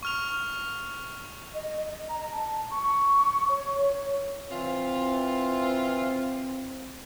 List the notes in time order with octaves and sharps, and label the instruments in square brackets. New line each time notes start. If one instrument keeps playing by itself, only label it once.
[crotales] C#6 F6 F7
[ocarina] D#5
D#5
A#5
A5
C#6
C#5
[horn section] E3 F4 [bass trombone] C4